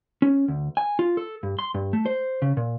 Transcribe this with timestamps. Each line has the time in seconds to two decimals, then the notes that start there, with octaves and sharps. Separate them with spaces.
0.22 C#4
0.48 D2
0.77 G#5
0.99 F4
1.17 A4
1.43 G2
1.59 C6
1.74 G2
1.93 A3
2.06 C5
2.42 C#3
2.57 A#2